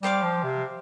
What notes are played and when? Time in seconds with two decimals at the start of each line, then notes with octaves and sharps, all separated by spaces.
0.02 G3 G4 C5 F5 D6
0.23 F3
0.43 C3